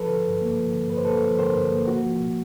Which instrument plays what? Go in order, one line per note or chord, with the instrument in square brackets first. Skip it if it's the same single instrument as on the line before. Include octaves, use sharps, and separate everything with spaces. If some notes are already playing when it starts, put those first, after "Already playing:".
Already playing: [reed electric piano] F3 A4 B4
D3
G2
A#3
F3
D3
G2 B4
C5
A#3 A4 B4
F3
D3 A#4 C5
G2
A#3
A#3 F#4
F3
A#2